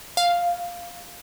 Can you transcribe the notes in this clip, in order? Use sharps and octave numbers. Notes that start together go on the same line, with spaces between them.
F5